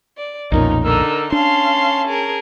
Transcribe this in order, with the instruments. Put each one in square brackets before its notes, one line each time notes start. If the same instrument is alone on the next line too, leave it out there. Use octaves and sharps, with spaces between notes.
[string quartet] D5
[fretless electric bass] B1 F2 A#2 [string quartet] C#4 [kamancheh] D#4 A#4
[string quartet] D3 D#4 [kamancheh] A#4 E6
[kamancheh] C#4 A5 [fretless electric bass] D4 [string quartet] F5 C6
[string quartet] G#4 A#4